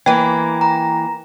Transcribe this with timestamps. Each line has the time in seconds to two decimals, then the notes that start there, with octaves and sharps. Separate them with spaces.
0.06 E3 A#3 G5 G#6
0.61 A#5